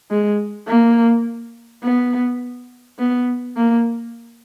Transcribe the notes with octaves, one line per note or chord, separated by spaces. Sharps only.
G#3
A#3
B3
B3
A#3